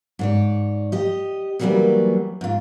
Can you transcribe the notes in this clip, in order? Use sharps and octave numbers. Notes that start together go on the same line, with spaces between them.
G#2 C#5 D5
G4 D#5
D#3 E3 F#3 G3 A#3 B3
G#2 F4